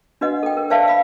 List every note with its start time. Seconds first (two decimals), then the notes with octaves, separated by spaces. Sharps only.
0.21 D4 F#4 B4 D#5 F#5
0.43 A4 G5
0.57 A#4
0.70 B4 C5 D5 E5 F5 A5
0.88 F5 B5